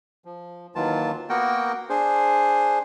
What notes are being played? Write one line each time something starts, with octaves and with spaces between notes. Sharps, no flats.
F3
D#2 D#3 E3 F#3 F4 A5
A#3 B3 F#4 A#4 G5
D4 G#4 C5